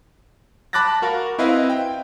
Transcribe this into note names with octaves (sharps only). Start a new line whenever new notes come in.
A5 B5 D6 F#6 A6 A#6
F#4 A#4 F5
C4 E4 B4 D#5 F5
G5